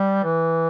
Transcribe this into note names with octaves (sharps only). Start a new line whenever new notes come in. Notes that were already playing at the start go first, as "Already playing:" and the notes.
Already playing: G3
E3